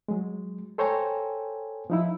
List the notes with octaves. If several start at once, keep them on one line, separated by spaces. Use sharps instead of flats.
F#3 G#3
A4 C5 C#5 G5 G#5 A#5
F3 D#4 E4